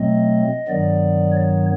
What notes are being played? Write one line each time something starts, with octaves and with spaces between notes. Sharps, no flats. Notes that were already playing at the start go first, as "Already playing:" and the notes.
Already playing: B2 F#3 A3 C4 D#5
G2 D#3 F#3 B3 D5
C#5